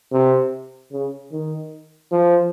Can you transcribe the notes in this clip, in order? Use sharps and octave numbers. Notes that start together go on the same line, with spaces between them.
C3
C#3
D#3
F3